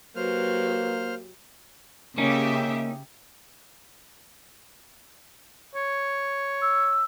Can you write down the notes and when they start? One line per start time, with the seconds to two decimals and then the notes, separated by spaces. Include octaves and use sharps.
0.16 F#3 A#3 G4 B4 C5 F6
2.18 C#3 A#3 C#4 D#4 G4 E5
5.75 C#5
6.62 E6